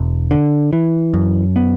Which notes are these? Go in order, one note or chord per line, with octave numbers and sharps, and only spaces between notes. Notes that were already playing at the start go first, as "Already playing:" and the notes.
Already playing: E1
D3
E3
F#2
B3